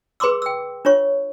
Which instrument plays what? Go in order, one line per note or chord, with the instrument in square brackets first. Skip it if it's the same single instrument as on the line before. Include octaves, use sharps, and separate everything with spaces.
[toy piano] G#4 B4 B5 C6 D6 E6
G5 E6
D4 F4 C#5 C#6